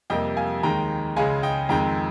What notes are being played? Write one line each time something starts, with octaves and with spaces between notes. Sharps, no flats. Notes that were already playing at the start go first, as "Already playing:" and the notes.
F2 C3 G3 A#3 D#5 G5
F5 G#5
D#2 D#3 G#3 G5 A#5
C#2 C#3 G#3 F5 G#5
D#5 G5
F2 D#3 G#3 G5 A#5